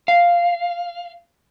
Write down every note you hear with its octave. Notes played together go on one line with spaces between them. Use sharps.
F5